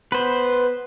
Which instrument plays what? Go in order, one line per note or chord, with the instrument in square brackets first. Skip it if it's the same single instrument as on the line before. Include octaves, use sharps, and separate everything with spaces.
[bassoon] B3 [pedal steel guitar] B4 C5